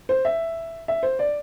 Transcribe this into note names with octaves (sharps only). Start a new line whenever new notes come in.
C5
E5
E5
C5
D5